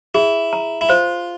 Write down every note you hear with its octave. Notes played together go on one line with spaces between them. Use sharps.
E4 G#4
A#5
E4
F4 C5